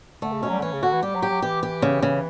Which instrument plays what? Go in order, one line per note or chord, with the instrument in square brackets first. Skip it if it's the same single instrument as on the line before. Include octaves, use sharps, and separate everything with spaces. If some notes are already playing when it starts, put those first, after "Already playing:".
[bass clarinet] D3 [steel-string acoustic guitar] A3
[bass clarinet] C#3
[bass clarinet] B2 [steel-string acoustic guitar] C#4
[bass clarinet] F#3
G3
D3
[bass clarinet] E3 [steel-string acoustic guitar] C#4
[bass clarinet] C#3
[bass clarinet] D3 [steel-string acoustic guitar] F#4
[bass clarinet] E3
[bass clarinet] G3 [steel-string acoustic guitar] G4
[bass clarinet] F#3
[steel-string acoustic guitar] G4
[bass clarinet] F#3
[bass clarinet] E3 [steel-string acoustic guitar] G4
[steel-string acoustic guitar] G4
C#3
C#3